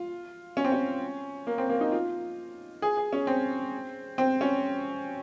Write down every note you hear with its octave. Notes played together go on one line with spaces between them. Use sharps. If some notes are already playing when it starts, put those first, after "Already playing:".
Already playing: F4
C#4
C4
C#4
A#3
C4
A#3
D#4
F4
G#4
G#4
C#4
C4
C4
C#4